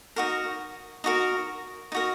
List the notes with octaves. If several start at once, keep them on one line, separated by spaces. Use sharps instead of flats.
D#4 F#4 A#4
D#4 F#4 A#4
D#4 F#4 A#4